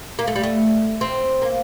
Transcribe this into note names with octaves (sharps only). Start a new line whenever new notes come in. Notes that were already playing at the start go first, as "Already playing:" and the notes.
A#3
A3
G3
A3
C4
A#3